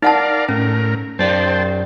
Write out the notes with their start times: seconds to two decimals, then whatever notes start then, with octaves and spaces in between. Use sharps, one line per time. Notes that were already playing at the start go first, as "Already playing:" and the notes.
0.02 D#4 A#4 D5 F5 F#5 A5
0.49 A2 C#4 A#4
1.19 F#2 C5 D5 G5 A5